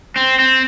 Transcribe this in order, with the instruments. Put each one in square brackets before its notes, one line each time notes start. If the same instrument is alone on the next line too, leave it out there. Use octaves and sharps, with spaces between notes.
[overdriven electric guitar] C4
C4